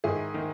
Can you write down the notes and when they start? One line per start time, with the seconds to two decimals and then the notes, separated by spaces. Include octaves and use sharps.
0.04 G#2 D#3 E4 G#4
0.34 D#3